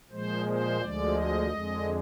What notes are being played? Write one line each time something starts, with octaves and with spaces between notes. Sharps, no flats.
A#2 F3 G#3 C5
C5
D2 D3 F3 G#3 D5
D#5
F2 D3 G#3